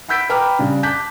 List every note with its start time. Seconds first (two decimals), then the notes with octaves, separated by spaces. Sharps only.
0.09 F#5 B5 E6 G6 B6 D7
0.30 B4 G5 A#5 B5 D6 F6
0.59 C#3 G3 D4
0.83 A5 D6 F#6 G6 B6